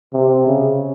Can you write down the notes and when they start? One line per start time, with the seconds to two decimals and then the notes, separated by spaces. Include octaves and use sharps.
0.14 C3
0.47 C#3